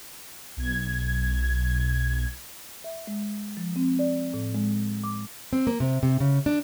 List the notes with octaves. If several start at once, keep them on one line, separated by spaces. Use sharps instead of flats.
B1 G#6
E5
G#3
F3
C4
D5
A2
G#3
D6
C4
A#3
C3
C3
C#3
D4